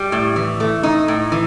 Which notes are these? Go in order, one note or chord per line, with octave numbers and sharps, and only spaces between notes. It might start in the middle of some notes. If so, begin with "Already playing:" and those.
Already playing: G3
A2
E3
A3
A2 D#4
A2
E3